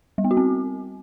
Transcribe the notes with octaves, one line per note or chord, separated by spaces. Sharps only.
G3
B3
F#4
C4